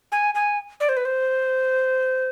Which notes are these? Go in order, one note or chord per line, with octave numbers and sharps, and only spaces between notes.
G#5
G#5
D5
C5
B4
C5